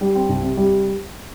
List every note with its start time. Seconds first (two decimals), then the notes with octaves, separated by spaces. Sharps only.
0.01 G3
0.15 C4
0.29 C2
0.43 C3
0.57 G3